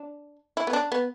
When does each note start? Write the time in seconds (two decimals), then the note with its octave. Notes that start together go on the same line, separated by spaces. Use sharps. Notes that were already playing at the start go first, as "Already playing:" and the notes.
Already playing: D4
0.57 E4
0.67 B3
0.73 D4
0.92 B3